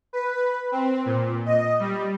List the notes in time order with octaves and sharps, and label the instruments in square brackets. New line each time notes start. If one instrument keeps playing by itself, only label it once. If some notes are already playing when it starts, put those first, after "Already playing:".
[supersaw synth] B4
C4
A#2
D#5
G3